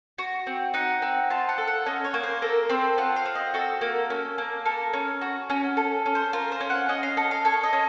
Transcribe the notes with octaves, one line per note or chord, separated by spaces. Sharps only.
F#4
C4
D#4 F#5
C4
F4 A5
F#5
A4
F#5
C#4 D#5
C#5
A#3
C5
A4 A#4
C4 C5
F4 F#5
F5
C4
D#5
F#4 A4
A#3
C#4
A#3
A4 A#4
C#4
F#4
C#4
A4
C#4
C5
F4 A#4
C5
C#4
F#5
C#4 D#5
F5
A4 D#5
F5
A4 C#5
D#5
C#4